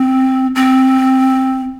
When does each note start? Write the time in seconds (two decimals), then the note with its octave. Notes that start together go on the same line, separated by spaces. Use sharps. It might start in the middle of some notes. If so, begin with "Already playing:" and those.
Already playing: C4
0.55 C4